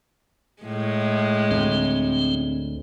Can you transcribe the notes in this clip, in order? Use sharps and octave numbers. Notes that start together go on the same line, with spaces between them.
A2 G#3
D2 C4